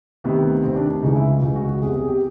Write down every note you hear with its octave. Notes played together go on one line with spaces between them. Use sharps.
D2 C3 D#3 B3
D2 C3 D#3 C4
D4
D4
C#2 C#3 E3 D#4
E4
F4
C#2 C#3 E3
F#4
F#4
E2 C3 E3 G#4
G#4
G4